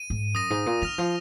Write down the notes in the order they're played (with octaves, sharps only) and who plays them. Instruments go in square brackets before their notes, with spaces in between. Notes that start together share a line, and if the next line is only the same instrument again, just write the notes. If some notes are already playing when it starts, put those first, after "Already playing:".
Already playing: [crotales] D#7
[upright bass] G#2
[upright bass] F#2 [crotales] D#6 A#6 D#7
[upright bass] G#2
A#2
[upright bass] D#3 [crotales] F6 A#6 F7
[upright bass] F3